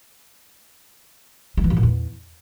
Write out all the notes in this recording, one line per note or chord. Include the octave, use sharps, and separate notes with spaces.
G#3
E3
B2
A#2
E2